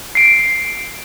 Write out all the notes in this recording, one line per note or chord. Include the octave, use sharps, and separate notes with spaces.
C7 D7